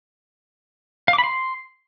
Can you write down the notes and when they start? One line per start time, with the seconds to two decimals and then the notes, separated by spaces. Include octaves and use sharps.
1.08 F5
1.13 D6
1.18 B5
1.24 C6